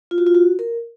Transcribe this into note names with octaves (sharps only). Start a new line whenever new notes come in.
F4
F#4
F4
F#4
A#4